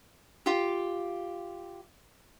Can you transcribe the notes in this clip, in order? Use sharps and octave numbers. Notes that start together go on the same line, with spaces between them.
F4 G4